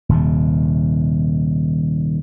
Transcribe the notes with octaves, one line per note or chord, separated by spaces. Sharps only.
D#1 D#2 C3